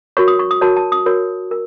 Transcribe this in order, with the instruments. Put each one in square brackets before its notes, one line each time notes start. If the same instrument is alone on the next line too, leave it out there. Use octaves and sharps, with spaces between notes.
[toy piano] F#4 A#4 C#5 C#6
D#6
C#6
D#6
F#4 A#4 C#5 A5
A5
D#6
F#4 A#4 C#5
A#4